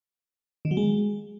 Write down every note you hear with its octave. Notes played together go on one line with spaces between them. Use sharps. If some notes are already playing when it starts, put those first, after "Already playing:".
D#3
F#3
G#3